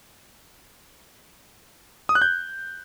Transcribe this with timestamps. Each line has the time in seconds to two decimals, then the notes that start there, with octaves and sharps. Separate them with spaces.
2.09 D#6
2.15 F#6
2.22 G6